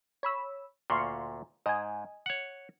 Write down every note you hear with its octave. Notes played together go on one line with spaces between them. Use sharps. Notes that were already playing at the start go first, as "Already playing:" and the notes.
C#5 B5 E6
D2 A#2 F5 C6 C#6
G#2 D#5 G#5
C#5 F#5